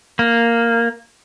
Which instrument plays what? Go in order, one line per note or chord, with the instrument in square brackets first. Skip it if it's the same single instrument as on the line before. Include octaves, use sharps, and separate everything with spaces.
[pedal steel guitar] A#3